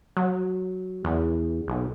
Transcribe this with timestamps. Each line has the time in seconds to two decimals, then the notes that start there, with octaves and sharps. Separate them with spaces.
0.17 F#3
1.05 E2
1.68 B1